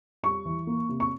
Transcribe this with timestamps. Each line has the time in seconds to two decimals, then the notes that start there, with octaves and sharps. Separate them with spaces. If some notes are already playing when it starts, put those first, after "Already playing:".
0.23 G3 C#6
0.45 E3
0.67 A#3
0.89 C3
1.00 C#6